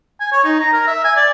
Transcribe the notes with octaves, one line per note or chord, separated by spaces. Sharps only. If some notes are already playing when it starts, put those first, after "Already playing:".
G#5
C#5
D#4
A#5
A#4
E5
G#5
D5